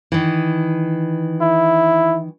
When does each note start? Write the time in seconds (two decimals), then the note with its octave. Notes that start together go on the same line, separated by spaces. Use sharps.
0.12 D#3 E3
1.41 E4